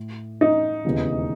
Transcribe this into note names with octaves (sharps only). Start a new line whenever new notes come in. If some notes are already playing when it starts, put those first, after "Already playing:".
Already playing: A2
D#4
E1 D#2 C#3 E3 B3